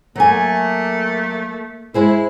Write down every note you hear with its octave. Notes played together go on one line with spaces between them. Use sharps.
F#3 A3 A#3 G#5
G#3 E4 G#4 C5